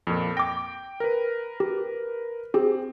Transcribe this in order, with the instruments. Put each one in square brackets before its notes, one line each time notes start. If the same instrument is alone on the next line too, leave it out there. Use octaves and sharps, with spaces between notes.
[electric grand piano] F2 A#2
[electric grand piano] G5 [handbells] D6 A#6
[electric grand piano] A#4 B4
[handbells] G4
[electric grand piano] C4 [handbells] G4 G#4